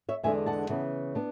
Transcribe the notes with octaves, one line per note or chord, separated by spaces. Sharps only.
C#5 E5
E2 D3 G#3 D4 E5 G#5
F#5 A5
C#3 E3 B3
B3 D4